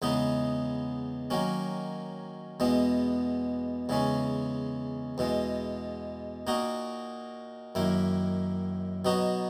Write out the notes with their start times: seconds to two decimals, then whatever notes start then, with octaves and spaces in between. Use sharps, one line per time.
0.02 E2 C#3 G#3 B3 D#4
1.30 D#3 F#3 A#3 C#4
2.60 E2 B2 G#3 B3
3.89 E2 C#3 G#3 C#4
5.18 E2 B2 G#3
6.47 A#2 A#3 D#4 F#4
7.75 F#2 D#3 A#3 E4
9.05 B2 F#3 B3 D#4 F#4